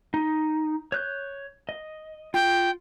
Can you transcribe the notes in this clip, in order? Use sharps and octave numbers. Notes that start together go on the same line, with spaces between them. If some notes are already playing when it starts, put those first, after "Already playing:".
D#4
C#5 F#6 G6
D#5
F4 G5